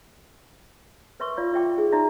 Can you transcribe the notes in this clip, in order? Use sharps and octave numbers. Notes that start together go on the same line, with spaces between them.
A#4 B4 E5 C6 C#6
F4 D5 F5
F4 E5 G5 D6
D#4 G#4 E5
D#4 F#4 D5 E5 A#5